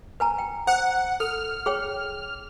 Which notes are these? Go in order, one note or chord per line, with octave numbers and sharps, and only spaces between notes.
B4 G#5 A#5
G5
C5 F#5
A4 F6
G#4 C#5 G5